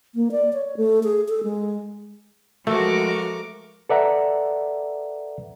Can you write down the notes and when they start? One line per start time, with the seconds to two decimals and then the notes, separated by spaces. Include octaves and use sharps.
0.15 A#3
0.31 D5
0.53 C#5
0.77 A3
1.04 G#4
1.29 A4
1.44 G#3
2.67 F3 G#3 A3 F#4 A#4 D6
3.90 A4 B4 D5 E5 F#5 A#5